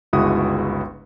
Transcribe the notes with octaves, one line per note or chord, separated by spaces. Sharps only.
G1 C#2 G#3 E4 F#4 D#6